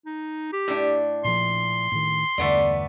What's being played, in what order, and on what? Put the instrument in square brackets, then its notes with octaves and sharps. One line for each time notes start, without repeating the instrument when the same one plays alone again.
[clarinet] D#4
G4
[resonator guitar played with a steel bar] A2 D4
[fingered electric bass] A#2 F3 [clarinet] C6
[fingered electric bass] A2 D#3
[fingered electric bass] E2 G2 D3 [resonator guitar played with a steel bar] A3 B3 D5